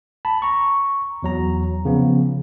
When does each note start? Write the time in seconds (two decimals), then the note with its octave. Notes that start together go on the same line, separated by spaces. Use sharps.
0.25 A5 B5
0.42 A#5 C#6
1.23 E2 F#3 A#5
1.85 C#3 F3 B3